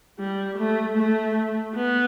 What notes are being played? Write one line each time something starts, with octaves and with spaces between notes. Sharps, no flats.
G3
A3
A3
B3